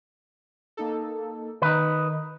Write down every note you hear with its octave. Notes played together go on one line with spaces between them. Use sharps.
A#3 D#4 A4
D#3 D#4 B4